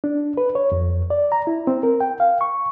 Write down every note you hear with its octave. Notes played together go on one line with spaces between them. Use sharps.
D4
B4
C#5
F2
D5
A#5
E4
C4
A#4
G5
F5
C#6